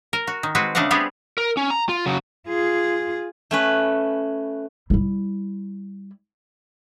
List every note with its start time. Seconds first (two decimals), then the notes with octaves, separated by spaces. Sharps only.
0.13 A#4
0.27 F#4
0.43 D#3
0.55 G#3 C4 F#4 B4
0.75 C#3 A3 D4 D#5 F5 F#5
0.91 G3 B3 C4 D4 G4 G#4
1.38 A#4
1.57 C#4
1.70 A#5
1.89 F4
2.06 C#3 F#3
2.48 F4 G#4
3.51 A3 C#4 B4
4.90 G3 E4